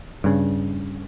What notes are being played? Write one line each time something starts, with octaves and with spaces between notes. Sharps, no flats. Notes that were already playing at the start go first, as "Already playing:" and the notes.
G2 C#3